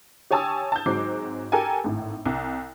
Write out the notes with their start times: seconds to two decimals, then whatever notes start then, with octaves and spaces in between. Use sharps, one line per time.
0.31 G4 C#5 G#5 A5 D#6 E6
0.72 A5 G6
0.86 G#2 F#3 G#3 C4 D6 C7
1.52 G4 A4 A#4 G5 G#5
1.84 G#1 A2
2.26 C2